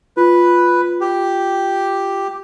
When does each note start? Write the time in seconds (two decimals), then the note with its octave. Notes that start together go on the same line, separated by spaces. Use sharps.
0.17 F4 B4
1.01 G4